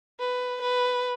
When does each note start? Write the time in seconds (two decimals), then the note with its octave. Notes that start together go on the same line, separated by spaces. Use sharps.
0.20 B4
0.61 B4